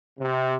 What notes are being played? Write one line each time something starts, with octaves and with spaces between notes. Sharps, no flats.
C3